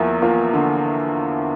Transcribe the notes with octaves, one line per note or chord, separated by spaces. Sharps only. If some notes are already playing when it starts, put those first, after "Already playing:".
Already playing: E2 F3 A#3 E4 F4 E5
A#3 F4
D3